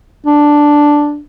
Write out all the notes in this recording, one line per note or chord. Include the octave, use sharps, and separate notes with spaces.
D4